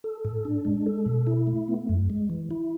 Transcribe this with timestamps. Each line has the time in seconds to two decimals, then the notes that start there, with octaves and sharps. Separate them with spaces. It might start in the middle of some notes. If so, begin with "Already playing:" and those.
0.04 A4
0.25 A2
0.45 D4
0.65 G#3
0.86 A4
1.06 B2
1.27 E4
1.47 A3
1.68 B3
1.89 F#2
2.10 G#3
2.30 E3
2.51 E4